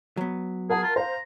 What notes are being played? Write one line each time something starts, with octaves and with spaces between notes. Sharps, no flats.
F#3 B3
G#4 A#4 F#5 A5
F4
C5 F5 A#5